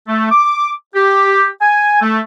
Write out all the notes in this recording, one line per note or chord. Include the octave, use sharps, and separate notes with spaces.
A3
D6
G4
G#5
A3